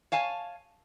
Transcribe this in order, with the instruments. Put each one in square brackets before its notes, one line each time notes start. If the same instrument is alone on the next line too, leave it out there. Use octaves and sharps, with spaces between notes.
[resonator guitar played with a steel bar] C#5 F5 G#5 A5